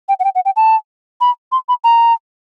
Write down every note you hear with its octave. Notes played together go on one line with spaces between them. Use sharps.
G5
F#5
G5
F#5
G5
A5
B5
C6
B5
A#5